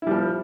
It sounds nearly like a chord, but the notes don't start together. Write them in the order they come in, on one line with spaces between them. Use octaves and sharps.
E4 G3 F3